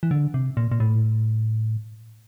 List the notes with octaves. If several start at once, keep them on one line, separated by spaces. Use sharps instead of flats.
E3
D3
C3
A#2
A#2
A2